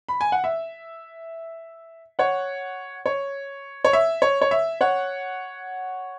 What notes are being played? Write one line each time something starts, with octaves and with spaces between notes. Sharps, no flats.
B5
G#5
F#5
E5
C#5 F#5
C#5
C#5
E5
C#5
C#5
E5
C#5 F#5